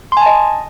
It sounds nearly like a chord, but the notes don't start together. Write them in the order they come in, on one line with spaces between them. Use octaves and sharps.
C6 G#5 A5 D#5